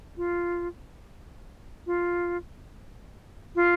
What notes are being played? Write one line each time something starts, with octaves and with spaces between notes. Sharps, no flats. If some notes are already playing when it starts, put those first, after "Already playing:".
F4
F4
F4